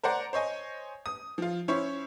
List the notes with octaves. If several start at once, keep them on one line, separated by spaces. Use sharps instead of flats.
A#4 C5 D5 F#5 A#5
C5 C#5 D#5 G#5
D#6
F3 F4
C#4 E4 C5 C#5